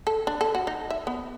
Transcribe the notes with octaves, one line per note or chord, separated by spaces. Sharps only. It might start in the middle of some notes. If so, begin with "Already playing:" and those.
A4
D4
A4
F#4
D#4
E5
B3